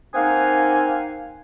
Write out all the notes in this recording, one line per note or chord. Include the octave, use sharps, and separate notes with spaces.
A#3 C4 D#4 F5 F#5 G#5